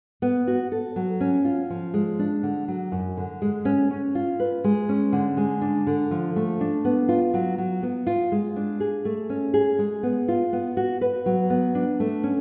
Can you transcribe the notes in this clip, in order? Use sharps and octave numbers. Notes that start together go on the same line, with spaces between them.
B3
F#4
A4
F#3
C#4
F4
F3
G#3
D4
D3
F#3
F#2
D3
G#3
C#4
C#4
F4
B4
G#3
C#4
D3
G#3
D4
D3
F3
A3
D4
B3
F4
F#3
F#3
B3
F4
G#3
D4
G#4
A3
C#4
G#4
G#3
B3
F4
B3
F#4
B4
F#3
B3
D4
A3
C#4